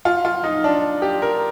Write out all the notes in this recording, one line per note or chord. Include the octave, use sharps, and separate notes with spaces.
F4
F4
D#4
D4
G4
A#4